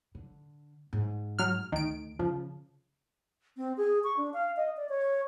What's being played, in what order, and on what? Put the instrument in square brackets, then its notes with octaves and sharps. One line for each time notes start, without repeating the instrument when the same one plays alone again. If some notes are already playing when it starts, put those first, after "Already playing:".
[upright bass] D3
G#2
[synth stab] F#3 F6
[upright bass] D2 [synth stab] D#3 D7
[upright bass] C#3 [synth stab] F3
[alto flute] C4
G#4
C#6
D4
F5
D#5
D5
C#5